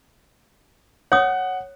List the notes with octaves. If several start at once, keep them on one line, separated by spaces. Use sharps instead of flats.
C#5 F#5 D#6